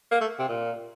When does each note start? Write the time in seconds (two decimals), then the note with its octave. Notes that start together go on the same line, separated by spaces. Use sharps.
0.11 A#3
0.21 A3
0.39 C3
0.48 A#2